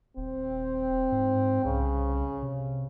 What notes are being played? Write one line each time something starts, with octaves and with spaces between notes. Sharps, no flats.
D#1 C4
G#2
C2 C#3
C3